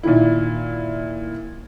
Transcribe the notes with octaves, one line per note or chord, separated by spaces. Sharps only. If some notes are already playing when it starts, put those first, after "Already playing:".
A#2 D#3 E4